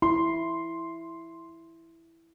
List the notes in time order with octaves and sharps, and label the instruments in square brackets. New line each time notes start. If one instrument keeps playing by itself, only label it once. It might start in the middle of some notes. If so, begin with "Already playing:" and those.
[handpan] E4 [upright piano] C6